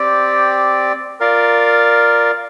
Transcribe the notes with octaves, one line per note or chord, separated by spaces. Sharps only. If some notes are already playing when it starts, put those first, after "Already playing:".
Already playing: C4 G4 D5
F4 A#4 D5 F5